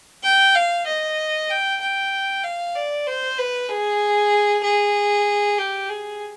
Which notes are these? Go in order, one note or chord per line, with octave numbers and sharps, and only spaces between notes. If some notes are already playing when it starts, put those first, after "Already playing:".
G5
F5
D#5
G5
G5
F5
D5
C5
B4
G#4
G#4
G4
G#4